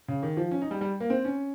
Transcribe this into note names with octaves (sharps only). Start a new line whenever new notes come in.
C#3
D#3
F3
C#4
D#4
G3
G3
A#3
C4
C#4